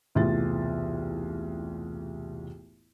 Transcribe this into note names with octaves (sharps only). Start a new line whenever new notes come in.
E1 C2 A2 F4 C6 A6